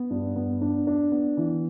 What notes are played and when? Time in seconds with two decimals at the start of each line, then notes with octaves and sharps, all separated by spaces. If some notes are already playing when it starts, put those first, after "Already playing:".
Already playing: B3
0.10 G2
0.36 B3
0.61 D4
0.87 D4
1.11 B3
1.37 E3